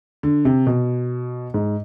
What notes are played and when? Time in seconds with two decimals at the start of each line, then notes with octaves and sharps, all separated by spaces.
0.23 D3
0.45 C3
0.67 B2
1.54 G#2